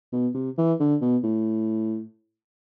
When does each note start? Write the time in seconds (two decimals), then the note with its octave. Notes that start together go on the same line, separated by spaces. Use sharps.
0.13 B2
0.34 C3
0.58 E3
0.80 D3
1.01 B2
1.24 A2